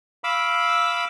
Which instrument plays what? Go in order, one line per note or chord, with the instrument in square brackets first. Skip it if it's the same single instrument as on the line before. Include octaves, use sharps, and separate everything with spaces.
[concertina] F5 B5 D6 E6